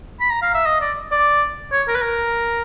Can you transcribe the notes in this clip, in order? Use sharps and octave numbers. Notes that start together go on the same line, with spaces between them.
B5
A#5
F5
E5
D#5
D5
D5
C#5
A#4
B4
A#4